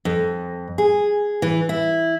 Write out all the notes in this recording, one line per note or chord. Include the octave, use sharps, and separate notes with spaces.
F2
G#4
E3
E4